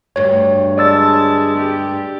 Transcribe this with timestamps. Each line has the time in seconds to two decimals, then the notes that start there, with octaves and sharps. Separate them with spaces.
0.16 D2 G2 C#5
0.78 G#3 D5 A5 E6 A6
1.57 G4